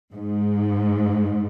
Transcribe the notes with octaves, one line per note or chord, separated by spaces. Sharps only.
G#2